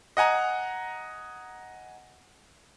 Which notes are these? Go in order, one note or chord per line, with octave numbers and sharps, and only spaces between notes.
D#5 F#5 G#5 A#5